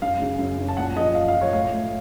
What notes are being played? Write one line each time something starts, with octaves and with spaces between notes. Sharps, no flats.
F#2 F5
C#3
F#2
F#2
A5
A#2 F#5
F3 D#5
F3 F5
F5
F3
C#5
A2 F5
A2